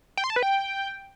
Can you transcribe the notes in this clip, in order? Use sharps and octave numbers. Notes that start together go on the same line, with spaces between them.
G5
C6
A5
B4
G5